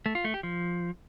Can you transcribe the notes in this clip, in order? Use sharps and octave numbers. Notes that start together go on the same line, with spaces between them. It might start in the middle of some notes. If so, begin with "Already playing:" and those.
A3
F4
A3
G4
F3